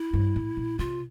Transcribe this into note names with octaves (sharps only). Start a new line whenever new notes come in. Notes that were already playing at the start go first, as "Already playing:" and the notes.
Already playing: E4
G2
A2
A#2
C3 F4